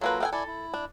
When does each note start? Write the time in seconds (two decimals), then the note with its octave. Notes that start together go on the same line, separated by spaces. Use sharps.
0.01 F#3 A#3 F4 A4 B4
0.20 B3 A4 F5 G5 G#5
0.33 E4 A4 D5 G#5
0.47 E4
0.74 D4